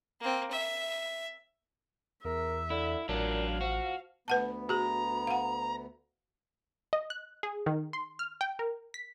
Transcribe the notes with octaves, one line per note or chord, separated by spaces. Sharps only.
A#3 C4
E5
E2 A#4 E5
D3 E4
A1 A#2 F#3 D4 F5
F3 F#4
D2 B3 B4 F#5 A5
F#4 G#4 A#5
F5 F#5
D#5
F#6
G#4
D#3
C6
F6
G5
A#4
B6